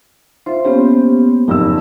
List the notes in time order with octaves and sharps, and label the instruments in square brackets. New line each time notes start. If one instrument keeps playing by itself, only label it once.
[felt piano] F4 [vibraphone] C5 E5
[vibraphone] A#3 B3 G4 [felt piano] C#4 C5
[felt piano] F#1 F2 E6 [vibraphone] D#4 G4